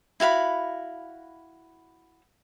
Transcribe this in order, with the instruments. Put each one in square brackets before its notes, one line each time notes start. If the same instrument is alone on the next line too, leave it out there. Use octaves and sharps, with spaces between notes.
[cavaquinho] E4 F#4 F5 B5